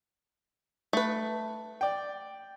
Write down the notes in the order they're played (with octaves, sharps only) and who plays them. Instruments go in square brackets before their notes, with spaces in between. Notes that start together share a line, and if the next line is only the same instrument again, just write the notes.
[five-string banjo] A3 B4
[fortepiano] D5 G5